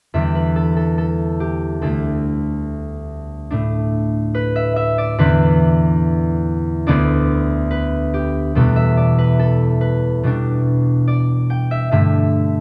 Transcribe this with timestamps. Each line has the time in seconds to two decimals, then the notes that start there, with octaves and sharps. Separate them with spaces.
0.14 E2 D3 G3 E5
0.35 B4
0.56 A4
0.77 A4
0.98 A4
1.40 G4
1.82 D2 D3 A3 A4
3.51 A2 A3 D4
4.35 B4
4.56 E5
4.76 E5
4.98 D5
5.18 E2 D3 B3 D4 B4
6.87 D2 D3 B3 D4 D5
7.71 B4
8.14 G4
8.55 E2 B2 G3 B3 A4
8.76 E5
8.97 D5
9.18 B4
9.39 A4
9.81 B4
10.23 B2 G3 B3 D4
11.08 D5
11.50 G5
11.71 E5
11.91 G2 D3 A3 E5